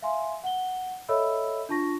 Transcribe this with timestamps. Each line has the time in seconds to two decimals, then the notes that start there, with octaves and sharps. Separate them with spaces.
0.02 E5 F5 G#5 C6
0.44 F#5 G7
1.09 A4 C#5 D#5 E5 B5 E6
1.69 D4 F4 A5 C#6 A#6